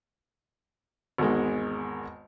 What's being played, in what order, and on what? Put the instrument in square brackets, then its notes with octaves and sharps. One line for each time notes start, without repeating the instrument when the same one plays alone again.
[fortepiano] G#1 E2 D#3 G#3